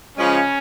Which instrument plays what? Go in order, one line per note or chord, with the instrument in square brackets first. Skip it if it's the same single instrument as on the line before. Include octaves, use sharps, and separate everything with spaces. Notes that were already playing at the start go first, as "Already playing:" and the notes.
[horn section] C#3 F3 G#3 C#4